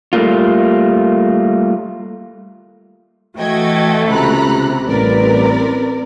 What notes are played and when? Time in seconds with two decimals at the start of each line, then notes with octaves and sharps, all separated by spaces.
0.13 G3 A3 A#3 F4
3.39 E3 A3 F#4 A4 D#5 G5 G#6
4.08 C#2 C3 A#5 B5 F#6
4.88 A1 G3 C4 A#4 B4 D5